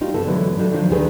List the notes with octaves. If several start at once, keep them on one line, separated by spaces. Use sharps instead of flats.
G3 D#4 F4 F#4
G2 C3 B3 A4
D3 E3 F#3 G#3 A3 B3
F#3 D4 D#4 F#4 A4
C3 D#3 F3 F#3 D4 F4
D2 D#3 D4 G#4 A4 B4